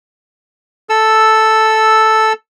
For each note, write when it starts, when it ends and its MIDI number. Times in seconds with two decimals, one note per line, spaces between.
0.90 2.33 69
0.90 2.33 88